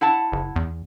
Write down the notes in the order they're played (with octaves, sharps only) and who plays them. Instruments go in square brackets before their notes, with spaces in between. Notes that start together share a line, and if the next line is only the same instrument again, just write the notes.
[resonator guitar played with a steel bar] E4 F#5 A5
[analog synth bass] F#1
E2